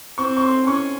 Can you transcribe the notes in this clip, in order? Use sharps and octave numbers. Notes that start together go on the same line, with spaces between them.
C4 C#6
C#6
C6
C#4 C#6